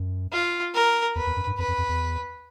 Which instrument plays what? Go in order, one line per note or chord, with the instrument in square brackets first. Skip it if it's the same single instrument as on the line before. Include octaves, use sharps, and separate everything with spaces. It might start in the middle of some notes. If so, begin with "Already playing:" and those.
Already playing: [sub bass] F#2
[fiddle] F4
A#4
[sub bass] E2 [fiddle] B4
[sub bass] E2
F#2
G2
[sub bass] F2 [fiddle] B4
[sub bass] F2
F2
E2